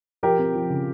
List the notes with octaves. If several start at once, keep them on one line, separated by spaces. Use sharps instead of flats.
F3 G4 A#4
C4
F3
C#3